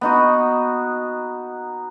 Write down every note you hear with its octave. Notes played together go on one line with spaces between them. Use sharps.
B3 D#4 F#4